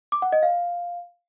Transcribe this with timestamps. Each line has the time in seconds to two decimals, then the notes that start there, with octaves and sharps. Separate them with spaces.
0.12 D6
0.22 F#5
0.32 D#5
0.43 F5